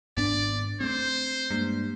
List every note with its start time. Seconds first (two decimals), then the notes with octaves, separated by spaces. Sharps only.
0.17 G#1 G#2 B3 D4 D5
0.80 A3 C4 C5
1.50 G2 G#3 A#3